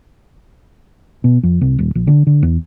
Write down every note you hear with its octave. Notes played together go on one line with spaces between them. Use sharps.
B2
F2
C2
D#1
A#1
D3
D3
E2